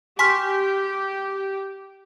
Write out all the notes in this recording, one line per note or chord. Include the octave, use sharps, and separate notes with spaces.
G4 G#5 C6 C#6 F6 B6